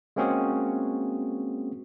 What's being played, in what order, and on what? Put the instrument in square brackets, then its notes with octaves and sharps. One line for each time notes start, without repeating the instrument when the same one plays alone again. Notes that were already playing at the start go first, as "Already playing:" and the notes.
[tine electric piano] G#3 A#3 C4 C#4 F#4 G#4